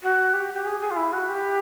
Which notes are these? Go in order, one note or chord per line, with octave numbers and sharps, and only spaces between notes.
F#4
G4
G4
G#4
G#4
F4
E4
F#4
G4